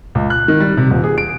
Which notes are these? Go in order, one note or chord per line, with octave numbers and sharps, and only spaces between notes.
C#2
F#6
D#3
G3
C3
D#1
G#4
D7